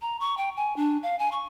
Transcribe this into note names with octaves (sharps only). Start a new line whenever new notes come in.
A#5
C#6
G5
G#5
D4
F5
G#5
C#6